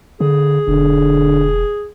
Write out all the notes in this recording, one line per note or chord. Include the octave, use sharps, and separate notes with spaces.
D3 G#4
E1 D3